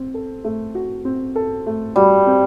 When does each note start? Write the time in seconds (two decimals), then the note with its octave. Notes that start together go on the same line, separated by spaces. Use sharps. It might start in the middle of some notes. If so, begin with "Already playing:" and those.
Already playing: C4
0.14 A4
0.44 A3
0.75 F#4
1.05 C4
1.36 A4
1.67 A3
1.96 G3 F#4
2.27 C4